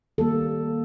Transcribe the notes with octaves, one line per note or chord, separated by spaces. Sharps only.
D#3 G3 A#3 A4